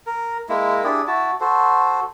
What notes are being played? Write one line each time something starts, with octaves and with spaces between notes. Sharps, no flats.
A#4
G#3 A#3 E4
D4 E4 G4 G#4
E4 F#4 A5
F#4 A4 C5